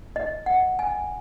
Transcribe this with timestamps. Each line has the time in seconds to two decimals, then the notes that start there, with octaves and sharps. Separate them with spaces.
0.16 D#5
0.46 F#5
0.79 G#5